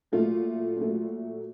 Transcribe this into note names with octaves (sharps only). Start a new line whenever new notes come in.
A#2 F#3 A3 F4
A#2 F#3 A3